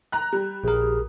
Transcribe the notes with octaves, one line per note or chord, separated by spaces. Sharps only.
A#5 F#6
G3
A#1 G#4 A#4